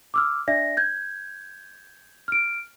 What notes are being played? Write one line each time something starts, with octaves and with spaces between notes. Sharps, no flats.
D6 E6 F6
D4 D5 E5 A#6
G6 G#6
F6 D7